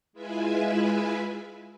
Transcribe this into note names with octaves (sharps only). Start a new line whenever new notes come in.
G#3 E4 F4 B4 E5 G#5